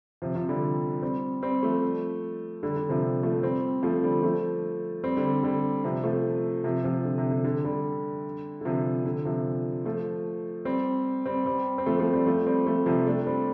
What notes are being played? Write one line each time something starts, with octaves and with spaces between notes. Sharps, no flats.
C3 F3
C3 F3
D3 G3
G3 C4
G3 C4
F3 A3
D3 G3
D3
C3 F3
F3 A3
G3 C4
F3 A3
D3 G3
F3 A3
G3 C4
D3 G3
D3 G3
C3 F3
F3 A3
C3 F3
C3 F3
D3
C3
D3
D3
D3 G3
D3
C3 F3
D3
C3 F3
F3 A3
G3 C4
G3 C4
G3 C4
C4
F3 A3
F3 A3
G3 C4
F3 A3
G3 C4
F3 A3
C3 F3
A3 D4
G3 C4